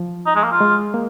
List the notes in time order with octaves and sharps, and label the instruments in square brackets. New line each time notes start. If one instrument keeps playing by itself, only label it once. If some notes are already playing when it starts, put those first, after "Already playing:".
Already playing: [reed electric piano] F3
[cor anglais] D#4
G#3
A#3
F4
[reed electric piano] G#3
A#3